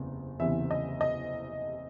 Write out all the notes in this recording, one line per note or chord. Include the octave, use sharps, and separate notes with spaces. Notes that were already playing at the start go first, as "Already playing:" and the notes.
Already playing: F#1 E2 C3
F#1 E2 C3 E3 E5
D#5
D#5